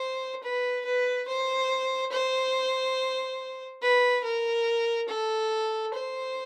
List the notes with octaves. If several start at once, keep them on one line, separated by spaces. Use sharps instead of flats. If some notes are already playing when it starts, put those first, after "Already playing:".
Already playing: C5
B4
B4
C5
C5
B4
A#4
A4
C5